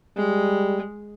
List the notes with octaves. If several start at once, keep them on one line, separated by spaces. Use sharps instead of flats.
G3 G#3